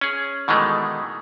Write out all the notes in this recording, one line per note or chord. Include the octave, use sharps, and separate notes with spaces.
C#4 G#4
B2 D#3 E3 G#3 A3